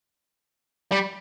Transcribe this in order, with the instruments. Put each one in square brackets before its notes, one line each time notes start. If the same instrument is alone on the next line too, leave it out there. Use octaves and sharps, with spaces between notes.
[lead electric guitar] G3